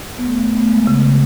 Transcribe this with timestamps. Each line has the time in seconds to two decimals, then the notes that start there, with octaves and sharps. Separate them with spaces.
0.18 B3
0.26 A3
0.37 A3
0.55 B3
0.60 A3
0.72 G#3
0.87 C#3
1.03 C#3